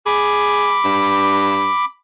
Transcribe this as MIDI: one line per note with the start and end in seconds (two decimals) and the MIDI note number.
0.06 0.78 68
0.06 1.85 83
0.06 1.85 86
0.85 1.71 43